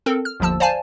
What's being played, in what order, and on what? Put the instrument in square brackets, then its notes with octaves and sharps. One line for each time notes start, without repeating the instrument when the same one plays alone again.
[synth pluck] C4 A4 A#4
F6
G1 D#2 F3 A5 E6
C5 D5 F5 G#5 A5